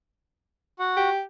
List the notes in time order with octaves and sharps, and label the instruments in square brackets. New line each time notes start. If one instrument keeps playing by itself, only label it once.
[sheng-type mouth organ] F#4 F#5
[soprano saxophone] G4